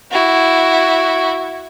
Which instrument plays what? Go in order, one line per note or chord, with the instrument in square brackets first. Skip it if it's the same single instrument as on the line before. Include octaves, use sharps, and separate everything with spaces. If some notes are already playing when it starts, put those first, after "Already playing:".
[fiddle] E4 F#4